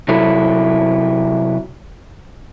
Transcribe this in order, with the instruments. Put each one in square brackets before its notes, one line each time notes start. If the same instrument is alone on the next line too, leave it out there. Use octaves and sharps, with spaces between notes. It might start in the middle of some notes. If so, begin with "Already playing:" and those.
[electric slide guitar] C3 F#3 E4 A4